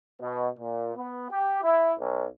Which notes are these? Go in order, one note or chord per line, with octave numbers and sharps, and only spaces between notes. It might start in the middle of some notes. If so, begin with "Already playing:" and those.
B2
A#2
B3
G4
E4
B1